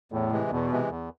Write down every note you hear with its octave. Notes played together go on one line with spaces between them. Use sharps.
E2 A2
C3 E3 G#3
E2 B2
C3 E3 G#3
E2